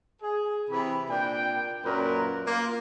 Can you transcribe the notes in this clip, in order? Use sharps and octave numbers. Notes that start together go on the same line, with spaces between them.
G#4
C3 E3 B5
A#2 D4 G5
F#2 A#2 A#4 B4
A#3 F4